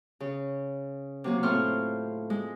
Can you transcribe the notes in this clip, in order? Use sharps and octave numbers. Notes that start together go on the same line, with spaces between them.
C#3
C3 F#3 A#3
A2 C4 F4 C5 C#6 F6
G#3